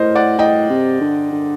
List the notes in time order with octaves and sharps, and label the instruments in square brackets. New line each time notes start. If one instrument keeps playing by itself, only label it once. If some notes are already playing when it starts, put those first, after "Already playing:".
Already playing: [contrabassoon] A2 [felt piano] A#4 C5 D#5
[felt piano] D5 F#5
[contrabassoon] A2 [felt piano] D#5 G5
[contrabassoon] C3
D3
D3